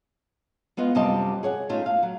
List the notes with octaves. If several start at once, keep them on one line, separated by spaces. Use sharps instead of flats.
G#3 B3 F4 D#5
F#2 C3 G3 F4 D#5 A5
G#4 C#5 F#5
A3 C#4 D#4 F4 G4
F5
F#3